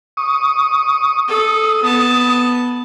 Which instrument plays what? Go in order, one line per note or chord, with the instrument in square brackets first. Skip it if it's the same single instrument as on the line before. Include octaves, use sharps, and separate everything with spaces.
[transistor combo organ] C#6 D#6
[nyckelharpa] A4 [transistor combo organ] D#6
[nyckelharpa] B3 A5